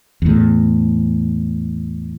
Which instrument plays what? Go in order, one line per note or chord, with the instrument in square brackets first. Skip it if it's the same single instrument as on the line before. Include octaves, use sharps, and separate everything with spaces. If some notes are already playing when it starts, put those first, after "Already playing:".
[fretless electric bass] E2 A2